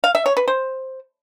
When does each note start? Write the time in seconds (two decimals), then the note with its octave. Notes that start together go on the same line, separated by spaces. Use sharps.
0.04 F5
0.15 E5
0.26 C#5
0.37 B4
0.48 C5